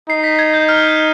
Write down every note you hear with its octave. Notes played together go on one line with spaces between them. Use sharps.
D#4 C7
B6
G#6
G6
F6
G6